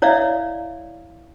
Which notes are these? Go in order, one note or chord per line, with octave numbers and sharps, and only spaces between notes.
E4 C#5 D5 E5 F5